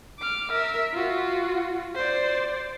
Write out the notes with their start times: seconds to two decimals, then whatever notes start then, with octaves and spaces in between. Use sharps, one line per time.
0.19 D6 F6
0.52 A#4 E5
0.94 F4 F#4
1.95 C5 D5